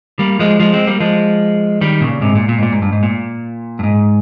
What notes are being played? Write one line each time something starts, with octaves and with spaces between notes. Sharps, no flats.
G3 A#3
F3 G#3
F3 G#3
G#3 C4
G3 A#3
F3 G#3
D#3 G3
A#2 C#3
G#2 C3
A#2
A#2
G#2
A#2
G#2
G2
G#2
A#2
G2
G#2